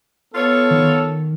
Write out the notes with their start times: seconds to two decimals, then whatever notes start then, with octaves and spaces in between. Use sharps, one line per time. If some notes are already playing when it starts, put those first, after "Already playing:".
0.35 B3 F4 A4 C#5
0.71 D#3